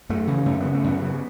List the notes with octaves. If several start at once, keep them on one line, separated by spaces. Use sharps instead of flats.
F#2 A3
C#3 E3
F#2 A3
C#3 B3
A3
F#2 B3
C#3